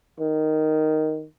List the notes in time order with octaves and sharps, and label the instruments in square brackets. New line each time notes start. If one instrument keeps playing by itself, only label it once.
[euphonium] D#3